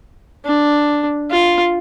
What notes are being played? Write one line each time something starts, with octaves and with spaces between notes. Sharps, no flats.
D4
F4